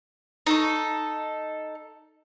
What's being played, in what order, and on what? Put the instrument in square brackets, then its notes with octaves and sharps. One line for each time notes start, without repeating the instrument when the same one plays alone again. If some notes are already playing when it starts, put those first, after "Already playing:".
[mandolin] D#4 A4 C#6